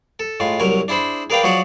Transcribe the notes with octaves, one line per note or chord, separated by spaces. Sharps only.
A4
A2 G#3 F4
C2 F#3 A#4 G#5
D4 E4 G#4 C5 B5
G#4 A#4 B4 D5 F5 G5
F3 F#3 F#4 G#4 D5 F#5